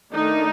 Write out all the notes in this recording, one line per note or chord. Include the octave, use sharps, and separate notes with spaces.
D#3 A3 D4 D#4